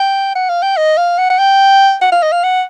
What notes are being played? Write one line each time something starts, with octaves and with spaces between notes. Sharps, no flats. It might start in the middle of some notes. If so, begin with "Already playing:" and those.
Already playing: G5
F#5
F5
G5
D#5
F5
F#5
F#5
G5
F#5
F5
D#5
F5
F#5